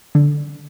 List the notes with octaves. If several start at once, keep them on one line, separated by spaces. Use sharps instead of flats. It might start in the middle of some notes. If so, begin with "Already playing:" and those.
D3